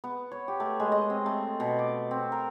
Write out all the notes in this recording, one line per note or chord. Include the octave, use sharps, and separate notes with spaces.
B3
C#5
G4
A3
G#3
D#5
C4
A3
B2
D6
C4
A#4